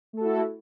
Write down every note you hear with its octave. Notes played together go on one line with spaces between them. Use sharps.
A3 E4 F#4 A4